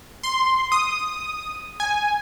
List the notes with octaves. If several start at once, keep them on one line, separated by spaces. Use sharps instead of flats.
C6
D#6
G#5